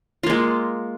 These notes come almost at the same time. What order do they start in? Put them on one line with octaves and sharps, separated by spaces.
F4 A#3 G#3